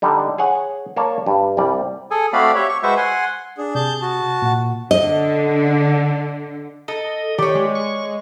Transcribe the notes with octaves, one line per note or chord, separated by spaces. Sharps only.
D3 G3 D#4
G#4 C#5 F#5
A#3 C#5 D5 A5
G2
C2 G3 D5
G#4 A4 G#5
A3 C4 F#4 D5 F5 B5
G4 C#5 E5
C#6
G#3 F#4 B4 C5 E5 C#6
F#5 G#5 C6
D4 G#4
C3 G#4 A5 G6
F#4 A5
A#2 F#5
D3 D#5
A4 D#5
D#3 G4 C#5 D5
G#3
C#6